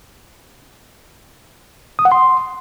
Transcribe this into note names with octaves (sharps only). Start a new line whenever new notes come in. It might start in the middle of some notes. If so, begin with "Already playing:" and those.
D#6
F#5
C6